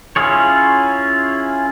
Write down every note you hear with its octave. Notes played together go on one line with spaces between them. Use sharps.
C#4 E4 F4 G#4 C#5